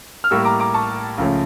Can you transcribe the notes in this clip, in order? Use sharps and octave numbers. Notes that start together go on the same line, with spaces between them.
F6
A2 G3 A#3 C#6 E6
A#5 D6
A#5 D6
A5 C#6
C#2 C#3 F3 A3 C#4